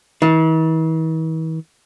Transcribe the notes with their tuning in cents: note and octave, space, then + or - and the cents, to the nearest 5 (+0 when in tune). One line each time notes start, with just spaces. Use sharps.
E3 -45